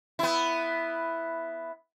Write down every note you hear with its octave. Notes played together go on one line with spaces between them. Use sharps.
B3 E4